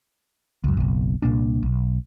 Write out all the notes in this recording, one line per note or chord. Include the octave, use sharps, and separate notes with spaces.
C#2 F#2
F#1 B1
C2 A#2 A#3 D4
B1